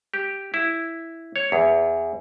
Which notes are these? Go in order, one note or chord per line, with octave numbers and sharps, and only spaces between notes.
G4
E4
C#5
E2